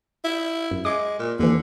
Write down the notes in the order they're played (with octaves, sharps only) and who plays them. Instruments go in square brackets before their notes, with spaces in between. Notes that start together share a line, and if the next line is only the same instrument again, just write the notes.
[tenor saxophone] E4
[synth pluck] F#2
[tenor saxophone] G#3 [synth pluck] D6
[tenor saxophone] A#2
[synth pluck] D#2 E3 [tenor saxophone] D3